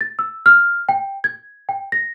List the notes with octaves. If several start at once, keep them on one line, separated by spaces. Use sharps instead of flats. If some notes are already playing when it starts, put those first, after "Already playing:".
A6
E6
F6
G5
G#6
G5
A#6